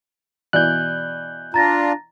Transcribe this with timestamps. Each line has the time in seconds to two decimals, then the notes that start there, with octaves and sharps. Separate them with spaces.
0.53 B2 E3 D5 F#6 G6
1.54 D4 F4 A#5 A6 A#6